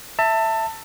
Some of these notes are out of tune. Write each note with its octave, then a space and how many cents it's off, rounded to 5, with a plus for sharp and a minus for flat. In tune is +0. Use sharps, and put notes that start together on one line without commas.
E5 +0 A5 +25